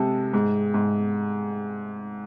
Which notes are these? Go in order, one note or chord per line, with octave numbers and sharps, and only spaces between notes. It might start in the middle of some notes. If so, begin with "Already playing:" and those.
Already playing: C3 G#3 A4
G#2
G#2